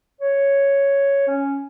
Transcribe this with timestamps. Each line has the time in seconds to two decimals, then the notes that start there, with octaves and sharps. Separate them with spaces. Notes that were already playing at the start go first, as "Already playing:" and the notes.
0.21 C#5
1.27 C#4